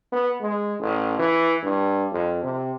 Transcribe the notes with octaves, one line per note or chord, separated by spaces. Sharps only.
B3
G#3
A1
E3
G2
F2
C3